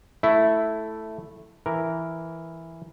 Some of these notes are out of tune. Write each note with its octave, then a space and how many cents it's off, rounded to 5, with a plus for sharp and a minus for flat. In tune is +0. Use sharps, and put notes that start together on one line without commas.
A3 +0 E4 +0
E3 +0 A#4 +0